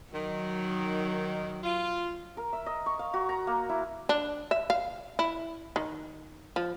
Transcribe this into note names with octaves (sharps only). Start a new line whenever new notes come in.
D#3 F#3
F4
A#4
E5
D#5
C#6
F5
F#4
A#5
A#3
E4
D4
E5
F5
E4
D#3
F3